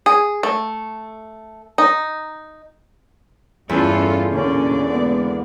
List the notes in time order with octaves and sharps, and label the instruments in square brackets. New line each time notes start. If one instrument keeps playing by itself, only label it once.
[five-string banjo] G#4
A3
D#4
[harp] E2 [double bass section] G2 [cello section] C#4 F4 A4
[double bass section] B2 A#3 C#4 [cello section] D3 D5
[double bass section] G#2 A#3 B3